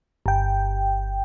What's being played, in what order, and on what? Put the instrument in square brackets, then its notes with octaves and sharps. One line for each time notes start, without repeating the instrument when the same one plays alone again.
[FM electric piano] G1 G5